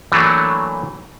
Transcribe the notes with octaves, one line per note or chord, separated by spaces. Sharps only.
E3 F#3 A3 A#3 D4